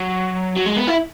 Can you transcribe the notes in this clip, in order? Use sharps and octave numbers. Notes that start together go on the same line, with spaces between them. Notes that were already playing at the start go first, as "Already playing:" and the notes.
Already playing: F#3
F#3
G#3
B3
E4